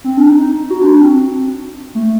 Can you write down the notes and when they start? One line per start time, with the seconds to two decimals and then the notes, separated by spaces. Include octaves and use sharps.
0.04 C4
0.17 D4
0.30 D#4
0.71 F#4
0.81 D4
0.92 D4
1.01 C4
1.95 A3